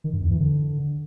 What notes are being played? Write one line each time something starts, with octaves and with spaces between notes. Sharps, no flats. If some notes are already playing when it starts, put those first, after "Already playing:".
D#3
G2
E2
E3
D3